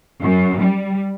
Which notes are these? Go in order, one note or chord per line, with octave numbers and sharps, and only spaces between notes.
F#2
G3